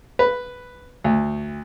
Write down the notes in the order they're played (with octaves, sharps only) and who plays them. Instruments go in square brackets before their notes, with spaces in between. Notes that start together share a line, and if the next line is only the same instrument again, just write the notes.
[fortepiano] B4
D2